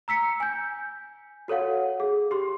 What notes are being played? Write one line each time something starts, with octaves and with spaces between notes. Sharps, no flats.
A#5 E6 B6 C#7
G#5 G6
F#4 A4 C#5 F5 F#5
G#4
G4 C6